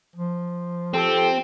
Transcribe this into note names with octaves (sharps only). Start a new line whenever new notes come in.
F3
C4 F4 G4 A4